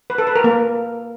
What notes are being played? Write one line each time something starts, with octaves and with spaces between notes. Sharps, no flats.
B4
A4
B4
A#4
A#3